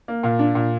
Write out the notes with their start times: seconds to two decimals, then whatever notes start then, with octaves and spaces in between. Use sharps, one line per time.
0.08 A#3
0.23 A#2 F5
0.39 D4
0.55 A#2